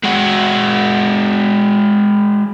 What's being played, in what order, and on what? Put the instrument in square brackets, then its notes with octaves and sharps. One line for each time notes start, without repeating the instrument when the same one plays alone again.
[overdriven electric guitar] G#3 F#4